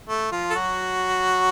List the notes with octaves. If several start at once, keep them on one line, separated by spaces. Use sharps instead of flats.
A3
F3 F4
A4
F#3 F#4